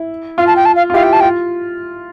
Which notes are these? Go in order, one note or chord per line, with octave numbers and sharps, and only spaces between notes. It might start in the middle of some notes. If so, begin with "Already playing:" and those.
Already playing: E4
F4 F5
A5
G5
A5
F5
F4
E4 G4 F5
G5
A5
F4 G5